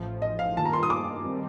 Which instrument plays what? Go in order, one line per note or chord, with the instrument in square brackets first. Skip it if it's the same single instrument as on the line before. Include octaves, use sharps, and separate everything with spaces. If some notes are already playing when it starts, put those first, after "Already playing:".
Already playing: [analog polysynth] A1 A2 F3
[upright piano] D#5
F5
[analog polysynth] G2 D#3 A#3 F4 [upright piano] A5
[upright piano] A#5
C6
D#6
D6
[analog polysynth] D#3 G3 C4